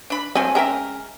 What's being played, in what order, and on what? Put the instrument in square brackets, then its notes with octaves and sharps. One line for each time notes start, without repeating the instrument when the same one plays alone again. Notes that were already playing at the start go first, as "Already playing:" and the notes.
[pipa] D4 B5
[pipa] F3 F#3 A3 [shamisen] C4 [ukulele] G#5
[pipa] G#3 A#4 E5 [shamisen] C#4 G5 A#5